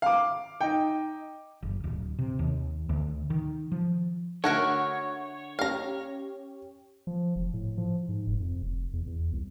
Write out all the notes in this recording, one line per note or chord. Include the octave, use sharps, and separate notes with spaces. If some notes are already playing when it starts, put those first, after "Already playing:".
F5 D6
D#4 G5
F#1
D1
C3
D#2
D2
D#3
F3
D3 A3 F#4 A#4 C#5 F#5
C#4 G4 F5 A#5
F3
F1
A2
F3
G#2
F1
F2
F1
E2
E2
C2